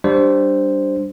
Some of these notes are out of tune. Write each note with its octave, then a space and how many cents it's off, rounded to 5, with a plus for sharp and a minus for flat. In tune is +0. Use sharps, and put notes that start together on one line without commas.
G3 +0 D4 +0 C5 +0